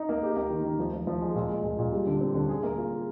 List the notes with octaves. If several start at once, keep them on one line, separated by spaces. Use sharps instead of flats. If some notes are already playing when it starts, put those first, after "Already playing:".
Already playing: D#4
A#3
G4
A#3
D#3
D#3
F3
F3
F3
G#3
A#2
G#3
A#2
A#2
G3
D3
C4
D3
G#4
A#3
F4
G#4